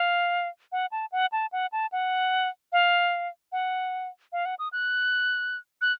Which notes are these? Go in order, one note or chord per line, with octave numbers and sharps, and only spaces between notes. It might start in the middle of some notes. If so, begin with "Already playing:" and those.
Already playing: F5
F#5
A5
F#5
A5
F#5
A5
F#5
F5
F#5
F5
F#5
D#6
F#6
F#6